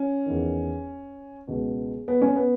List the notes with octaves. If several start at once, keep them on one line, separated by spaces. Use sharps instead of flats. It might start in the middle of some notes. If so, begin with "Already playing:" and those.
Already playing: C#4
E2 D#3
C#2 B2
B3
C#4
B3